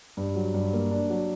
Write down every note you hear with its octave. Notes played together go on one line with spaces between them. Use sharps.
G2
F#3
G2
A#3
D4
F#3